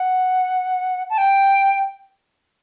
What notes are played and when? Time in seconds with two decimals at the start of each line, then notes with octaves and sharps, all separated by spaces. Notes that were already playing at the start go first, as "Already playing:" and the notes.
Already playing: F#5
1.10 A5
1.18 G5